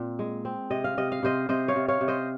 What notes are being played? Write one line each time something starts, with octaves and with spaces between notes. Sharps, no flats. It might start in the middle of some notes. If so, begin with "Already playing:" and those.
Already playing: A#2 C4
G#3
C4
C3 D#5
F5
C3 D#5
F5
C3 C5 D#5
C3 C5 D#5
C#5 F5
C3
C#5 F5
C3
C5 D#5